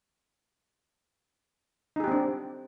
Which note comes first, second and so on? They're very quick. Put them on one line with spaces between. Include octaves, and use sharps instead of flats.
D#4 G#4 G4 C4 D4